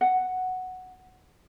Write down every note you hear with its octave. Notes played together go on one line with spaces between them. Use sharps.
F#5